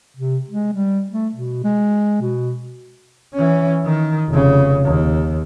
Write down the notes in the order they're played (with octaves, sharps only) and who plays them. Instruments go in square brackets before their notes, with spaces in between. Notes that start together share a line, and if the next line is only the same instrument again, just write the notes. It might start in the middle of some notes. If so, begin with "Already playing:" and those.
[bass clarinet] C3
G#3
G3
A3
B2
G#3
B2
[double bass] E3 C#4
D#3
F1 C#3
D#2